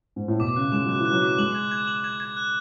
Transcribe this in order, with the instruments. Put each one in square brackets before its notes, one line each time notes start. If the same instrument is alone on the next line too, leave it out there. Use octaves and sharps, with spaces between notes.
[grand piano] G#2
A2
[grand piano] B2 [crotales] D6
[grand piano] C#3 [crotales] F#6
[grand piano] G#3 [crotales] E7
[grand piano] F#3 [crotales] F#6
[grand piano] E3
[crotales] F#6
[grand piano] F#3
[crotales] D6
[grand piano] G#3 [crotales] F#7
[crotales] G#6
G#6
F#7
G#6
G#6
F#6